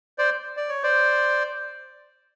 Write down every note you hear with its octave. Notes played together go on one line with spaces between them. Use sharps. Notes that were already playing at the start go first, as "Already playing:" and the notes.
C5 D5
D5
C#5
C5 D5